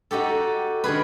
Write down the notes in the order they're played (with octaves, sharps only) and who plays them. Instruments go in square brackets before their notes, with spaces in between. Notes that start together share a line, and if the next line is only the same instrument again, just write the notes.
[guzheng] D#4 F#4 G4 A4
D#3 D4 G#4 B4